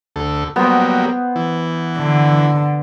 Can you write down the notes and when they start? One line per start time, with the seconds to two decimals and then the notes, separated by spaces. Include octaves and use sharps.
0.16 D2 A4
0.56 F#3 G3 A#3 B3 C5
1.36 E3
1.97 D3